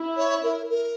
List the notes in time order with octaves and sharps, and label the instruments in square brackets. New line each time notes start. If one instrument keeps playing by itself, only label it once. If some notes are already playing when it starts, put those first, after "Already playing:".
Already playing: [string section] E4
[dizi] C#5
A#4
A#4